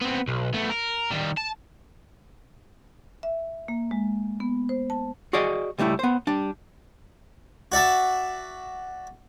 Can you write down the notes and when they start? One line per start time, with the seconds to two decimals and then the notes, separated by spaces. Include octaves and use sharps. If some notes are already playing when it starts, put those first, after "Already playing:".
0.02 B3 C4
0.28 B1
0.54 A3 B3
0.70 A#4
1.11 D#3 G3
1.37 A5
3.23 E5
3.68 A#3
3.91 G#3
4.40 B3
4.69 C5
4.90 A5
5.33 F#4 G#4 D5 D#5
5.78 C#2 G3 A3 E4
5.99 B3 C5
6.27 G3 D4
7.72 F#4 D5 E5 A5